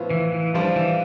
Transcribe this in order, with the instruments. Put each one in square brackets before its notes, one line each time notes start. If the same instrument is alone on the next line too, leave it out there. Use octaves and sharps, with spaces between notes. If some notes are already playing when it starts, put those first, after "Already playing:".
Already playing: [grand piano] A2 F3 B3 F4 C5
[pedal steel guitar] E3
E3
[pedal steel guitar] F3 [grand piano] G3 D4 F4 C5
[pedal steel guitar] E3